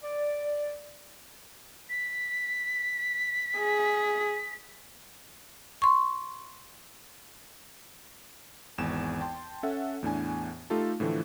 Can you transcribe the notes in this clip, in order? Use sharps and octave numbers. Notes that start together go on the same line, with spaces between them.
D5
B6
G#4
C6 C#6
G#1 E2 G#5 E7
G5 A5 C6
C#4 A4 E5 F#5
E2 A2 D4 G#5
A3 D#4 F4 G4 A4 A5
A2 D3 E3 F3 A3